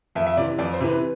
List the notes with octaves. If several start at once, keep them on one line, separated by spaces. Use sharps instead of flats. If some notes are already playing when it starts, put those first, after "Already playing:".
F2 E5
E5
C3 E3 D5
F2 D5
C5
C3 E3
B4